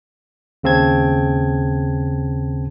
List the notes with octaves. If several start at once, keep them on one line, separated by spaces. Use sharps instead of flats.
D#2 C#3 C4 A5 G#6